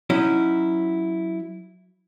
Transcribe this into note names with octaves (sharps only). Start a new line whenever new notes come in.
F#3 C#4 D#4 E4 F#4